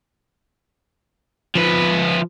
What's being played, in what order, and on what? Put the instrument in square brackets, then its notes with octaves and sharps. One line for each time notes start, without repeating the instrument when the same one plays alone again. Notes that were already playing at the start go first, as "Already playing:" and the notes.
[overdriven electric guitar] F3 B4